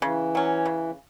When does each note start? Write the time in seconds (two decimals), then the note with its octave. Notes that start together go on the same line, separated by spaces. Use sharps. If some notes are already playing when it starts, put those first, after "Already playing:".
0.02 C#3 E3
0.35 F#3 C#4
0.66 C#3